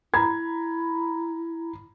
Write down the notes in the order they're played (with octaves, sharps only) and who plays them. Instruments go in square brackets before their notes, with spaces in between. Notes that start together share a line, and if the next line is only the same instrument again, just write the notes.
[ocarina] E4 [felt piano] A#5 B5 G#6